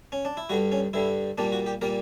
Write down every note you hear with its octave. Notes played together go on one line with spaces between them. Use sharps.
C#4
D4
E4
G2 D3 G3 F#4
C#4
G2 D3 G3 E4
A#2 G3 A#3 D4
F#4
G4
A#2 G3 A#3 A#4